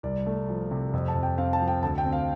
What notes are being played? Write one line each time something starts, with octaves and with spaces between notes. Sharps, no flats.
C2 D5
A3
F3
C3
F2
A5
F2
G5
C4 F5
A5
F3
G5
D2 A5
G5
C4
F5